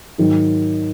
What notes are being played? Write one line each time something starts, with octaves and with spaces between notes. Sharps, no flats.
G#2 D#3 F#3